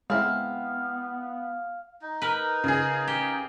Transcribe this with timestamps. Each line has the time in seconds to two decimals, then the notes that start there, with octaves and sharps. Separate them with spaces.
0.10 G#3 B3 C4 E4 F5
2.02 D#4
2.22 A#4 B4
2.64 C#3 G#4
3.08 G4